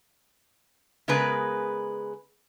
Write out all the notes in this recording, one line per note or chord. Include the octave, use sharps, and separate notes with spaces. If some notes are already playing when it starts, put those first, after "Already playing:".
C#3 G#3 B3 G#4 A#4 B4